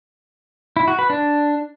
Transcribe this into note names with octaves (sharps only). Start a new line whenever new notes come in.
E4
F#4
B4
D4